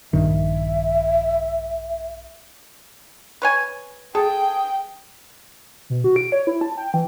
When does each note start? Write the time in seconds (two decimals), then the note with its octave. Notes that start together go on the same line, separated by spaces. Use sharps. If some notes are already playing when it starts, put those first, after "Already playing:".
0.13 A#1 G2 D#3 E5
3.42 B4 C#5 G#5
4.15 G#4 A4 G5
5.90 B2
6.04 F#4
6.16 D7
6.32 C#5
6.47 E4
6.61 A5
6.77 G5
6.94 E3